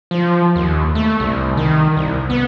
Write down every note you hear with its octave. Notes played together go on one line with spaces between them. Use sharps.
F3
D#2
A3
C2
D#3
C2
B3